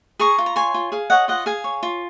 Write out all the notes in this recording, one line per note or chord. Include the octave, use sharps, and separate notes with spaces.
G#4 A#5 C#6
F4
A#5
C#5 G#5 C6
F4
G#4 F5
C#5 D#5 F#5
F4 D#5 F#5
G#4 F5 G#5
C#5
F4